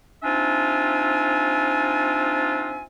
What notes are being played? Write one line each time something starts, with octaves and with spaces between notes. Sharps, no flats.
C4 D4 D#4 F4 E5 G#5